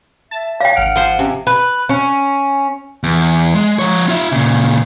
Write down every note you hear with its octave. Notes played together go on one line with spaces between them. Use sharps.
E5 A5
C#5 F5 G5
G#1 F#5 F6 D7
F3 C5
C3 C#4
B4
C#4
E2
G#3
F3 C#5
F4 E5
A#2 C#3